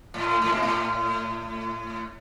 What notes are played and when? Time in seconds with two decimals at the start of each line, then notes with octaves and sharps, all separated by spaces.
0.14 A2
0.42 A2
0.52 B2
0.62 A2